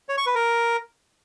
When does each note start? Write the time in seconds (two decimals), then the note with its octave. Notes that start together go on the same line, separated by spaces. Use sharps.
0.09 C#5
0.18 C#6
0.26 B4
0.35 A#4